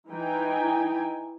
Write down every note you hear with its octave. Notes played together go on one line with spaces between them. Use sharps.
E3 D#4 E4 G5 G#5